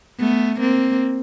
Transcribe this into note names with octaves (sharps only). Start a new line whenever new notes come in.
A3 B3
A#3 C4